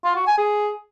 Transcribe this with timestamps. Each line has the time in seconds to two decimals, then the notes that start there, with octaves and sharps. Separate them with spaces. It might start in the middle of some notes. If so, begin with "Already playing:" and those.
0.04 F4
0.16 F#4
0.27 G#5
0.38 G#4